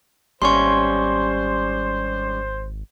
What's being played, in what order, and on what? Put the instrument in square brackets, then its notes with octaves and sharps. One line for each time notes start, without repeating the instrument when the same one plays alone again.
[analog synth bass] G#1 [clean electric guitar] G3 C#4 [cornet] C5 [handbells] C6 C#6